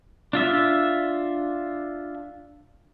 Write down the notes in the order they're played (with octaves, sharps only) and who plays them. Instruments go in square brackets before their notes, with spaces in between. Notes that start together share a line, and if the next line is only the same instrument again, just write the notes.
[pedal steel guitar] D4 F4 E5